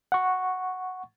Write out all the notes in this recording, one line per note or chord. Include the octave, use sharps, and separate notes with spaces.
F#5 C#6